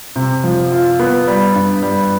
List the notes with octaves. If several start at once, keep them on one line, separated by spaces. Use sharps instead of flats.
C3
F3
F4
B3
G3
G2
G3